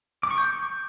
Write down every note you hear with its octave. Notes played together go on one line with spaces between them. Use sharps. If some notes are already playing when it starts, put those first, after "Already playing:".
D6
C#6
G6